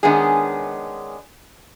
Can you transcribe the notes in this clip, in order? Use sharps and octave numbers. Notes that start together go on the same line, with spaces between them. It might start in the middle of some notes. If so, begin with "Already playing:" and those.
D#3 G#3 B3 C#4 D4 G#4